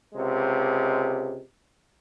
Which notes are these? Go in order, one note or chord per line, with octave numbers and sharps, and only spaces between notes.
C#2 C3 G#3